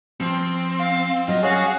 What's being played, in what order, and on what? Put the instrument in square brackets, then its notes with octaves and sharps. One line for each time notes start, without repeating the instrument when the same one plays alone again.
[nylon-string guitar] F3 [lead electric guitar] C4
[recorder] F5
[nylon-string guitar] F#3 F4 [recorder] D#5
[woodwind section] C#4 F#4 [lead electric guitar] G#4 G#5 [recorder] F5